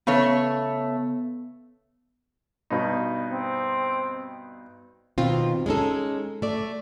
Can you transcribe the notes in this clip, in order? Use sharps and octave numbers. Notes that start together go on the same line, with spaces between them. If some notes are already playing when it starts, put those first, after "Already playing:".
C#3 A3 B3 C#5
G2 B2 D#4
C4
B2 D#3 C4 F4
G#3 C#4 D#4 A4
A3 D5